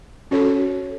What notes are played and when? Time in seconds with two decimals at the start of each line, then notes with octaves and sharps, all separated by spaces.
0.31 C#4 F#4 A4 C#5